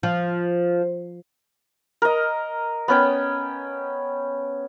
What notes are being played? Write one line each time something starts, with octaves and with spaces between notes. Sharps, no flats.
F3
A#4 D#5
B3 C#4 G5